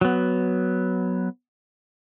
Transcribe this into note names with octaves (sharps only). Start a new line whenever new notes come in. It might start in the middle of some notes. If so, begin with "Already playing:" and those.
F#3 B3